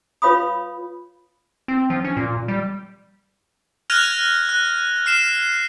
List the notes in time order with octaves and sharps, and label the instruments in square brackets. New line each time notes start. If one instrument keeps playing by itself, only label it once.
[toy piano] F4 B4 C#5 F5 B5 D#6
[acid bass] C4
F3
C#4
A#2
G3
[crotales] F6 F#6 G#6 A#6 D#7 F7
F#6
F6 C7 E7